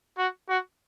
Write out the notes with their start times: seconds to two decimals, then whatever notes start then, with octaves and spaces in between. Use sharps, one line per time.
0.18 F#4
0.49 F#4